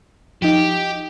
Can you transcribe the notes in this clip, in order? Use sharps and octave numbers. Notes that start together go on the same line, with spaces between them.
F3 D#4 G4